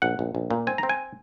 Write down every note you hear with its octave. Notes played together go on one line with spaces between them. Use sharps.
A#1 F#5
A#1
A#1
A#2
C4 G#5
C4 A#5
G#5